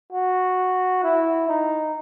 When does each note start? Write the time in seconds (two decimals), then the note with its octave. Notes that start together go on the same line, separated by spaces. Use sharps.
0.13 F#4
1.03 E4
1.48 D#4